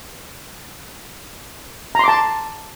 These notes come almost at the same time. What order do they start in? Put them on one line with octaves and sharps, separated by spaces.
A#5 C6 D6 A5